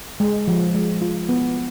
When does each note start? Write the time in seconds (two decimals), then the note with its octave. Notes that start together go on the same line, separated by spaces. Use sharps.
0.20 G#3
0.48 F3
0.74 G#3
1.02 F4
1.29 B3